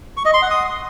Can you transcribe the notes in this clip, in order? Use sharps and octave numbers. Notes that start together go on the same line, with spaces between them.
C#6
D#5
C6
F#5
D#6